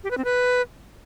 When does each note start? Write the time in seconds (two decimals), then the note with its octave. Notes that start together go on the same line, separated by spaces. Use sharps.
0.04 G4
0.11 B4
0.18 C4
0.25 B4